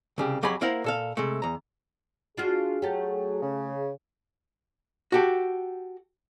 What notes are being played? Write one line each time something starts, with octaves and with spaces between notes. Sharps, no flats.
C2 C#3 G4
F2 F#3 G4 G#4 G#5 B5
A#3 E4 A#4 C5 F5 F#5
A#2 A4 F5
C3 G#3 A3
E2 A#5
D4 F4 F#4 G#4
F#3 A3 G4
C#3
F#4 G4 A4